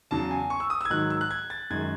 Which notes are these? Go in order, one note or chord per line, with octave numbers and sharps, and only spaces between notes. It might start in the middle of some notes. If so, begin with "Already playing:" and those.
E2 C#3 F#3 A5
G#5
C#6
E6
D#6
E6 G#6
G#2 D#3 F#3 F#6
E6
F#6
G#6
A6
F#2 D#3 G#3 G#6